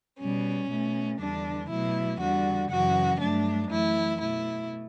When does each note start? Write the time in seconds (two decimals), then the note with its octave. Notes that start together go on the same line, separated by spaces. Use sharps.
0.19 B2 G3 C#4
0.69 B2 A3
1.19 E2 D3 G3 D4
1.70 B2 F#3 A3 E4
2.20 E2 D3 G3 F#4
2.70 F#2 C#3 E3 F#4
3.20 G2 F#3 A3 D4
3.70 F#2 E3 A3 E4
4.21 B2 A3 E4